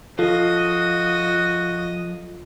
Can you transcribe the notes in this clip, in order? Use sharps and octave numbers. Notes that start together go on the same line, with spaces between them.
F3 F4 F#4 A4 D#5